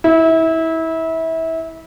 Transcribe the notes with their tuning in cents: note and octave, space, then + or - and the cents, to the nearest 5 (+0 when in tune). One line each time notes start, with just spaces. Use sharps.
E4 -25